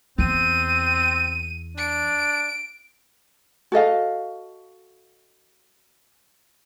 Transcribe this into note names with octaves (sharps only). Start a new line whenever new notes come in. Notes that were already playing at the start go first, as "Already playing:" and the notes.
E2 C4 D#7
D4 D7
F#4 A4 D#5 F5